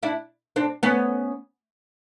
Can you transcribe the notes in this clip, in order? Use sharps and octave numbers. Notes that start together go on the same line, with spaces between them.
D4 E4
C4 D4
B3 C#4